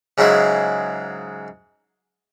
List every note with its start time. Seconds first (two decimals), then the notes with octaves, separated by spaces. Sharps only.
0.18 G#2 C#3 F#3 G#3 E4